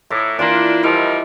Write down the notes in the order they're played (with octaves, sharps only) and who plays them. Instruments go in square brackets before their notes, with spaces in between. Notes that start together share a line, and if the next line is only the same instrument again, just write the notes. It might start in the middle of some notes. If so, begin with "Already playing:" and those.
[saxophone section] A2 [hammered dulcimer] A#5 D6
[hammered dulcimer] E3 F4 B4 [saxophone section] A#3 D4
[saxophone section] F3 G3 A#4 [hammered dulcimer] E4 D5 D#5